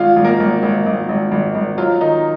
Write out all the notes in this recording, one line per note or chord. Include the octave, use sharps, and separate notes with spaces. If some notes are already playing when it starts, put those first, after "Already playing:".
Already playing: G#1 F4 F5
G#1
A#3 A#4
G#1
G#1
G#1
G#1
G#1
G#1
F#3 F4
D#3 D#4